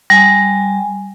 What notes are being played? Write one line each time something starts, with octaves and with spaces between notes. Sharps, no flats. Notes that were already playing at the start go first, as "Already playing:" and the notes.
G3 G#5